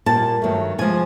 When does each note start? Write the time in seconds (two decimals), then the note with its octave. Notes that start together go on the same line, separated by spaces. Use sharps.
0.06 A#2 G3 A#3 A5
0.42 G2 D#3 F#3 A3
0.78 F2 C3 F3 G#3 G#5